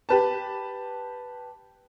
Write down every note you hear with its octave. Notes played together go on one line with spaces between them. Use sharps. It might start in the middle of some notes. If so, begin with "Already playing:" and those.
G4 B4 A5